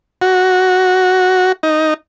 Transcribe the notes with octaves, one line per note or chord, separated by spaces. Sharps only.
F#4
D#4